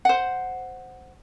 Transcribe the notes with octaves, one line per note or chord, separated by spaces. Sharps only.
C5 F#5